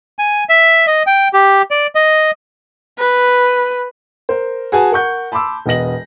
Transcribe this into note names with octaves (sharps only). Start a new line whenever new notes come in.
G#5
E5
D#5
G5
G4
D5
D#5
B4
A#4 C5
F#4 G#4 B4 G#5 A5
A#4 F#5 C#6 G6
A5 B5 C6 D6 E6
E1 B3 D#5 A#6 F#7